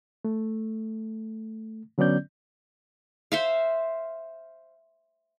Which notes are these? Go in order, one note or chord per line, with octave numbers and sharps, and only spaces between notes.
A3
D3 F#3 B3 C#4 D5 G6
C5 E5 F5